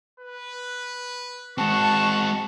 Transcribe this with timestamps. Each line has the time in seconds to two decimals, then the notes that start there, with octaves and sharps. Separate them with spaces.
0.19 B4
1.58 G#3 C4 F#4 A5 C#6